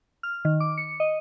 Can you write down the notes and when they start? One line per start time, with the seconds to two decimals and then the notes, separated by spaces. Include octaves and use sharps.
0.23 F6
0.45 D#3
0.60 D6
0.77 C#7
1.00 D#5